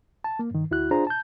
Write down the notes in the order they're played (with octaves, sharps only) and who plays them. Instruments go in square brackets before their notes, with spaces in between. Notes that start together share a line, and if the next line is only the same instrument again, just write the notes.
[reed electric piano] A5
A#3
G2 D#3
D2 E4 F#4 F#6
D4 F4 G#4 C5 A#5
A5 G6